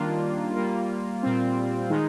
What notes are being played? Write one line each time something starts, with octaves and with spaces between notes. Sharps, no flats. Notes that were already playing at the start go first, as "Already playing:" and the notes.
Already playing: D#3 G3 A#3 D4 F4
G3 A#3 F4
A#2 G3 C4 F4
D#3 G#3 D#4